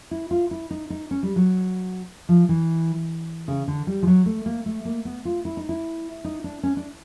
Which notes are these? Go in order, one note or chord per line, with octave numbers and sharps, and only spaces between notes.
E4
F4
E4
D#4
D#4
C#4
G3
F#3
F3
E3
C#3
D3
G3
F3
F#3
A3
A#3
A3
A#3
B3
F4
E4
D#4
E4
D#4
D4
C#4
D4